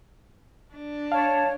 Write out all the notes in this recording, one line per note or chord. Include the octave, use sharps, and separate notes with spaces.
D4
C#5 F5 A5